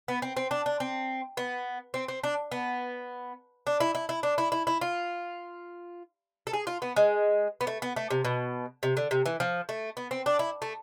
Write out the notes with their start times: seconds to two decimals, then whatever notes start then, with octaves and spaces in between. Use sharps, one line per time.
0.08 B3
0.22 C4
0.37 C4
0.51 D4
0.66 D4
0.80 C4
1.37 B3
1.94 C4
2.08 C4
2.24 D4
2.52 B3
3.67 D4
3.80 E4
3.95 E4
4.09 E4
4.23 D4
4.38 E4
4.52 E4
4.67 E4
4.81 F4
6.47 A4
6.53 G#4
6.67 F4
6.82 B3
6.96 G#3
7.61 B3
7.67 A3
7.82 B3
7.96 A3
8.10 C3
8.25 B2
8.83 C3
8.97 D3
9.11 C3
9.26 E3
9.40 F3
9.69 A3
9.97 B3
10.11 C4
10.26 D4
10.39 E4
10.62 A3